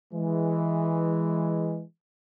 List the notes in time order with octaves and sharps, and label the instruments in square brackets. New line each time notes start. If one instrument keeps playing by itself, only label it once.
[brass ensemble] E3 G#3